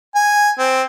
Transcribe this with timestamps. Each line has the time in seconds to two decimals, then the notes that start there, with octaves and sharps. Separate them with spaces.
0.15 G#5
0.58 C4